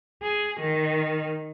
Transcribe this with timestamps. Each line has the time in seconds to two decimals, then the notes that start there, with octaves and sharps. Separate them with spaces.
0.22 G#4
0.60 D#3